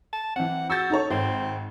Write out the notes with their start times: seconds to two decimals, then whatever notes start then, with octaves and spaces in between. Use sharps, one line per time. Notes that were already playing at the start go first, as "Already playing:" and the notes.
0.13 A5
0.36 E3 C4 F#5
0.70 F#4 E6 G6 A6
0.90 D#4 A4 C#5
1.10 G#1 C4